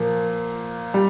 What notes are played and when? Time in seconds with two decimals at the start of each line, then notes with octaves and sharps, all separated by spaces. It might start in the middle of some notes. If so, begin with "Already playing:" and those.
Already playing: A#2 F3 A#3
0.94 G3